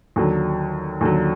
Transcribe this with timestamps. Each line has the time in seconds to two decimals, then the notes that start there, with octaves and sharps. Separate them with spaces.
0.16 D#2 D3 F#3
1.01 D#2 D3 F#3